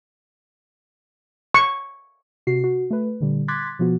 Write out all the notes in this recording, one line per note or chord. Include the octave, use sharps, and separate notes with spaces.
C#6
C3 F#4 C7
F#4
A3 B4
A#2 D3 G3
C6 D6 F#6 G#6 A6 B6
B2 F3 B3 F#4